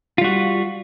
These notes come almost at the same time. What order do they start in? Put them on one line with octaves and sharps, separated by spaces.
F4 G3 F#4